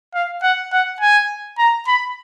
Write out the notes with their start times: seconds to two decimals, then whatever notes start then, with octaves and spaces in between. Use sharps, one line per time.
0.15 F5
0.43 F#5
0.73 F#5
1.01 G#5
1.59 A#5
1.88 B5